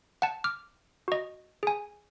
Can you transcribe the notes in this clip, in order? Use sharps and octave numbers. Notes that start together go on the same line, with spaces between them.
F#5 A5
D6 F6
F#4 D#5
G#4 G#5